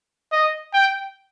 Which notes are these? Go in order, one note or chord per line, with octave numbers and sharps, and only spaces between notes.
D#5
G5